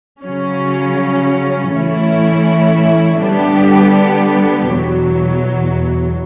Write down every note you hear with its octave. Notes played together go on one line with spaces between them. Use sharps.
C#3 F#3 C#4
A2 E3 A3 C#4 E4
D3 G3 B3 D4 G4
E2 B2 F#3